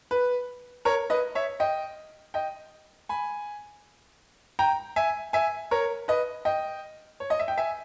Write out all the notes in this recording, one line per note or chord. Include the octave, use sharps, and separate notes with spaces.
B4
A#4 C#5
B4 D#5
C#5 E5
D#5 G5
D#5 G5
G#5 B5
G5 A#5
E5 G#5
E5 G#5
A#4 C#5
B4 D#5
D#5 G5
C#5
D#5
E5
G5
E5 G#5